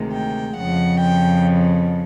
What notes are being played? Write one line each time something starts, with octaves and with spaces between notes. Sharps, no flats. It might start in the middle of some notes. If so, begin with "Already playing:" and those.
Already playing: D2 C3 D#3 G#3
G5
F2 C#3 F3 F#5
G5